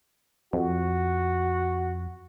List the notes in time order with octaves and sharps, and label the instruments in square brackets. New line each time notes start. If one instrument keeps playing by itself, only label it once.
[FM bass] F2 [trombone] F#4